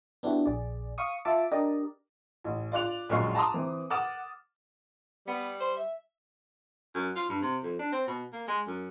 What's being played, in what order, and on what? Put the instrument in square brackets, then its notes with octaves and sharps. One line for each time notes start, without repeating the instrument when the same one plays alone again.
[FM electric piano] B3 D4 E4 F#4 G4
A#1 G#4 D5
F5 C#6 D#6
F4 E5 A5 D6
D4 G4 A#4 D5 D#5
[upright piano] A1
F4 D5 D6 F#6 F7
A#1 F#2 G#3 C#6 F6 C7
A5 A#5 C6 D6 D#6
E3 C4
F#5 D6 D#6 F6 A6 E7
[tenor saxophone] G3 [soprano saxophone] B3
[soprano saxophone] C5
E5
[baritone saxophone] F#2
F4
G2
C3
F2
D4
C4
B2
A#3
G#3
F#2